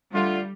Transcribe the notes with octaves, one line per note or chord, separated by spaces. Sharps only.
D3 G3 A3 D4 F4